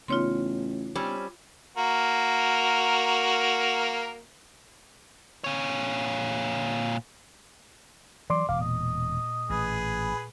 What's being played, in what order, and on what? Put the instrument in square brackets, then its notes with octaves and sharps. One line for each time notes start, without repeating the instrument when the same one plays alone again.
[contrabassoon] A1 [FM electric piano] C#3 B3 D#4 [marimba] F4 C#5 C6
[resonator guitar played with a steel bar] G3 C4 C#4
[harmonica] A#3 F#4 A#4
[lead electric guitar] A#2 C#5
[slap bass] E3 F#3 [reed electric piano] D5 C6 D6
[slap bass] E1 [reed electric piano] F5 [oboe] D6
[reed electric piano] A#2 [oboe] D#5
[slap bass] A1 [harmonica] G#4 B4